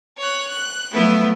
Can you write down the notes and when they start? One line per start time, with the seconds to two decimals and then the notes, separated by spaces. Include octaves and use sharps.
0.17 C#5 F#6
0.48 F#6
0.91 F3 F#3 A3 B3 E4